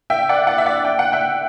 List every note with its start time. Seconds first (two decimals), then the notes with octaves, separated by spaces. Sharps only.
0.10 E5 G5
0.29 D5 F#5
0.47 D5 F#5
0.58 E5
0.66 D5 F#5
0.85 G5
0.99 F#5
1.12 E5 G5